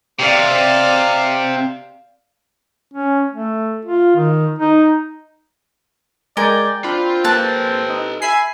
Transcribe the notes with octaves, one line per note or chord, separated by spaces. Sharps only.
C3 D5 F5
C#4
A3
F4
D#3
D#4
G#3 A#4 D5 G5 G#5
C4 D4 F4 B5
A#3 A4 B4 A5 F#6
D#4
E5 G#5 B5 C7